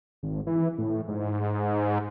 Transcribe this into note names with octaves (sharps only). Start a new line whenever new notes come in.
G#1
E3
A2
G#2